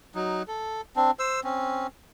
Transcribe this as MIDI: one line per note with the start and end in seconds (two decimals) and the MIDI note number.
0.15 0.43 54
0.15 0.43 63
0.48 0.81 69
0.96 1.11 60
0.96 1.11 62
1.19 1.40 72
1.19 1.40 88
1.44 1.87 60
1.44 1.87 61